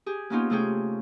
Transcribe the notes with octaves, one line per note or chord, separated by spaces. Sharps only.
G4 G#4
A#3 B3 C#4 D#4 F4 G4
C3 A3 C#4 G#4 G5